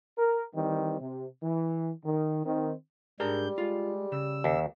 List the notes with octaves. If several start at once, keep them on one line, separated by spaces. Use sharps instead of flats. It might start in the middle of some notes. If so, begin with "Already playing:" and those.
A#4
D#3 E3 G3 C4
C3
E3
D#3
D#3 C4
G#2 G3 D4 G#4 A#4 A#5 G6
G#3 F4
C#3 E6
D#2